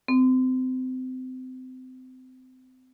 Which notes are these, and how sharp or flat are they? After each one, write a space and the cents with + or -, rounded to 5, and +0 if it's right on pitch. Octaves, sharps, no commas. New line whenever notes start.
C4 -30